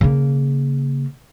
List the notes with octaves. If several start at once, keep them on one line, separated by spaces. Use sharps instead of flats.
C#3 A#3